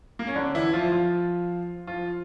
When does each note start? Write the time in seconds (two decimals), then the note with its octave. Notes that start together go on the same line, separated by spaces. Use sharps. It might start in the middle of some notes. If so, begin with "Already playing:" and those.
0.19 A#3
0.27 C#4
0.35 D3 D4
0.55 E3 E4
0.73 F3 F4
0.92 F3 F4
1.87 F3 F4